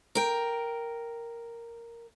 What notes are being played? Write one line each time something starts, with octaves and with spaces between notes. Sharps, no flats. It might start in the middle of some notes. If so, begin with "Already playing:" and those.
A#4 G5